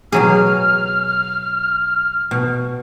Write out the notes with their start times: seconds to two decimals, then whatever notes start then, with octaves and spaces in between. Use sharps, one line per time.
0.12 B2 F#3 G#4 F6
2.31 B2